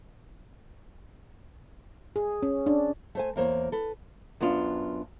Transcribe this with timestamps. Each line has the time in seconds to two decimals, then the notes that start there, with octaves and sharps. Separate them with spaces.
2.16 G#4
2.42 C#4
2.66 D4
3.15 A3 C5 G#5
3.36 E2 A#3 C5 C#5
3.72 A4 B4
4.40 F#2 B3 D4 F4